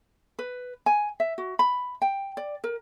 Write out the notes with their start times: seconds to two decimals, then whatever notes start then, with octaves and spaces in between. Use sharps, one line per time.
0.39 B4
0.86 G#5
1.20 E5
1.38 F#4
1.59 B5
2.02 G5
2.37 D5
2.64 A#4